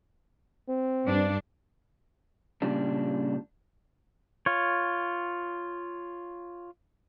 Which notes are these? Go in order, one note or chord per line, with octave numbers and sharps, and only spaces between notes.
C4
G2 D4
A#2 C#3 G3 D4
F4 C#5